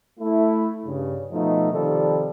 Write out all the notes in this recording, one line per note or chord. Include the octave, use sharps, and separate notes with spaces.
A3 E4
G2 C#3
B2 F3 A3 D#4
C3 D#3 F3 G3 A4